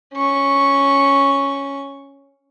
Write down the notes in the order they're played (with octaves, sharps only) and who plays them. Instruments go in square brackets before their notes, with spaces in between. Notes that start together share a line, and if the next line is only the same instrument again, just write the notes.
[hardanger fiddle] C#4 C#6